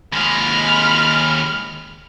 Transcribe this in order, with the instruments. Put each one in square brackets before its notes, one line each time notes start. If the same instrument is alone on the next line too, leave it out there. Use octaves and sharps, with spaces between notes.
[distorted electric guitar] D#2 G#3 [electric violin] B5 F6